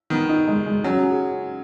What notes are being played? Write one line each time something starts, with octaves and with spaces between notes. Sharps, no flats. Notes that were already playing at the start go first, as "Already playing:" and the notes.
D#3 B3
D#4
G#3
G#3
F#3 C#4
G#4